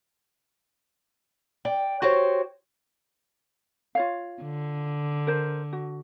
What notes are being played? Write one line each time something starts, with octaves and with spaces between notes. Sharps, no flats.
D5 G5
F#4 G4 C5 C#5
F4 C#5 F5
D3
A#4 C5
F#4